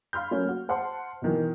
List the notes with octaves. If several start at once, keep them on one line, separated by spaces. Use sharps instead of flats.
F5 B5 C6 F6 G6
F#3 A3 A#3 C#4
F#4
C5 F#5 A5 C6
B2 D#3 E3